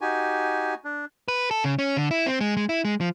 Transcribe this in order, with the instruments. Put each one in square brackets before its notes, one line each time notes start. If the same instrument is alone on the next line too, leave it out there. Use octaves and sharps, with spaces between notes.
[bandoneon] D#4 F#4 G#5 [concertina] G4
[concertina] D4
[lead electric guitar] B4
A4
C#3
C#4
D3
E4
C4
G#3
G#3
E4
G#3
F3